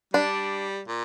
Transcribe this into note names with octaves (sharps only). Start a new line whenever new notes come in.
G3 D4
A#2